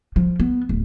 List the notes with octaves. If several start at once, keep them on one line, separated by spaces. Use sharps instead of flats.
F3
B3
D1